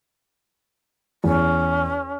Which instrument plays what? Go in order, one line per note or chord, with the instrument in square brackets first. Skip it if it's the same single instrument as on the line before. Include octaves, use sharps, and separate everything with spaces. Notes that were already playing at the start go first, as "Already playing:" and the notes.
[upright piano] E2 [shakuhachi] C#4